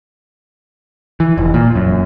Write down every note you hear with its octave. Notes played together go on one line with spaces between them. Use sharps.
E3
F1
A#2
F#2